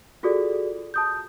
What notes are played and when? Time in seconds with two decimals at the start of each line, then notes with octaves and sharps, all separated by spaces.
0.23 F4 F#4 G#4 A4 D5
0.94 A5 D#6 G6